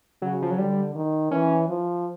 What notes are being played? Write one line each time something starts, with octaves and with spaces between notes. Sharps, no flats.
C#3 F#3
F3
F#3
D3 G3
D#3
E3 C#4
F3